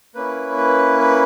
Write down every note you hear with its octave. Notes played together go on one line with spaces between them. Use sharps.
A#3 C#4 E4 B4
B4
B4